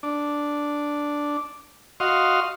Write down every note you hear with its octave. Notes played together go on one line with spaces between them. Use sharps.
D4
F#4 D#5 F5 C6